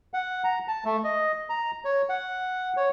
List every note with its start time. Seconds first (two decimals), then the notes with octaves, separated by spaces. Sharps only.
0.14 F#5
0.44 A#5
0.68 A5
0.85 A3
1.04 D#5
1.50 A#5
1.85 C#5
2.09 F#5
2.77 C#5